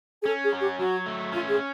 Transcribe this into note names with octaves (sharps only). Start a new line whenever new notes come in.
G#4
C#4 A4
G#4
F#3
G4
F#3 F#4
A3
C#4 F4
G#4